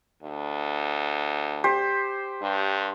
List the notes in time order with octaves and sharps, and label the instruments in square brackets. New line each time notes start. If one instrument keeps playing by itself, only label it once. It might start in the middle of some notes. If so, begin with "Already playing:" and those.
[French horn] D2
[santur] G4 C5
[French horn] G2